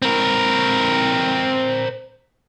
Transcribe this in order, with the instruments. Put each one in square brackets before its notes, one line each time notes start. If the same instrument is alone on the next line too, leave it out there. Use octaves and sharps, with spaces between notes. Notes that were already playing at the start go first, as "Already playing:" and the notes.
[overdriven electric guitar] C4 A#4